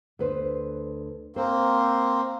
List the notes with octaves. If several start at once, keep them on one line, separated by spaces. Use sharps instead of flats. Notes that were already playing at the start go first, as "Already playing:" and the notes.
D2 B4 C5
A#3 C4 C5